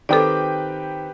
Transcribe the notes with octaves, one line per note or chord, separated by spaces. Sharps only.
D#3 C4 G4 A4 B4 D5 G5 D6